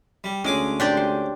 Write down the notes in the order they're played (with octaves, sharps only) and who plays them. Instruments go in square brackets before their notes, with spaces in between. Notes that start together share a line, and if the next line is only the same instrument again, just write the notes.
[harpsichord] G3
[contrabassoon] D2 [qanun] G#3 G#4 [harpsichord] C#4 D6
[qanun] C4 [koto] D4 G4 D5
[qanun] C5